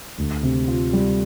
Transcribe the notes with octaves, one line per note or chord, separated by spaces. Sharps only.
D2
C3
F4
G3